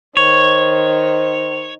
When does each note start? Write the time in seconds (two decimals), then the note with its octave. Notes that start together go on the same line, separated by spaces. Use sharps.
0.17 D#3 C5 C#5